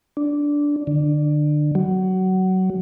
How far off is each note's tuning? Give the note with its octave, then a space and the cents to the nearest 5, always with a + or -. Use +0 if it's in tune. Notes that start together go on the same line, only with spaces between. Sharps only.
D4 -10
D3 +25
F#3 +20